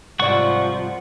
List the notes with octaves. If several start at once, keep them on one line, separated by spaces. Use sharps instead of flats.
C2 G#2 F3 D5 F#5 C#6